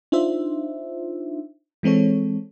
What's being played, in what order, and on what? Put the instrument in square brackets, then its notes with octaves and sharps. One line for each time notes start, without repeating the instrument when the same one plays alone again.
[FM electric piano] D4 D#4 F4 C5 E5
E3 G#3 C4 A4 C#5